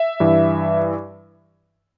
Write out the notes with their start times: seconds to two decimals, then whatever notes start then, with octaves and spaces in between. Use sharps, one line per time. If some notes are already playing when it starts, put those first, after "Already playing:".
Already playing: E5
0.20 G2 E3